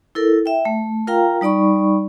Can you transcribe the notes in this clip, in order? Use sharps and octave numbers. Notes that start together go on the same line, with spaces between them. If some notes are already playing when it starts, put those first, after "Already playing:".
E4 A4 A#4
E5 G5
A3
F4 A#4 F5 G5 A#5
G3 D#4 D5 B5 C#6